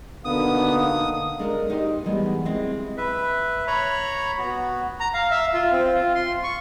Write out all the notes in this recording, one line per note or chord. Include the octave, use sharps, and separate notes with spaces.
B2 D3 A#3 B3 D#4 F5 D#6
G#3 D4 A4 A#4
D#4 G4 C5
E2 E3 G3 G#3 B3
G#3 C4 E4
B4 E5
C#5 A#5 B5 C#6
B3 F#4
A#5
F5
E5
F4
C4
F4
C6
C#6